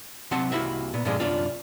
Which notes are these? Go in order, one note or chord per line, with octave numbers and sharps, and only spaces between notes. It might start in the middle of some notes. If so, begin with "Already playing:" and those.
C3 F#3 C4 F#5 A5
C2 A#3 E4 F#4 E5
A#2 B3
G2 A#2 D3 F3 G#3
C2 F#2 D4 F4